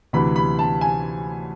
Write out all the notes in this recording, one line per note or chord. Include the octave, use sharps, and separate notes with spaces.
D2 C3 E3 B5
B5
A5
G#5